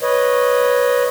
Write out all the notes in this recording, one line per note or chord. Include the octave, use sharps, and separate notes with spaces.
B4 C#5 D#5